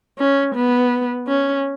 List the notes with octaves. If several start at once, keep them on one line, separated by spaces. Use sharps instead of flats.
C#4
B3
C#4